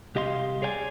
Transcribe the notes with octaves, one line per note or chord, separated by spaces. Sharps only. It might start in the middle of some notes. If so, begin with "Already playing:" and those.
C2 G4 D#5 F5 C6
G#4 C#5 D5 G5 G#5